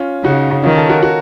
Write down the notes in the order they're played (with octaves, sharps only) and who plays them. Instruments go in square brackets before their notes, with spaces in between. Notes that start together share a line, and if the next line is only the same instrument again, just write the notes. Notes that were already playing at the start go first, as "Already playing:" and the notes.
Already playing: [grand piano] C#4 F4
[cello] C#3 [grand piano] D#4 F#4
[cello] D#3 [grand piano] C#4 F4
[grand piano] F4 A4
F#4 A#4
F#4 A#4